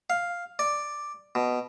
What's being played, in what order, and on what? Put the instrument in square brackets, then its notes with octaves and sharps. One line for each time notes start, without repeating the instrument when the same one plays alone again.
[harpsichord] F5
D5
B2